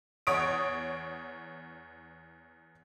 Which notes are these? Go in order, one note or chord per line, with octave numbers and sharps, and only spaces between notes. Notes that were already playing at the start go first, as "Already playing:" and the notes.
E2 C#5 D#6 D7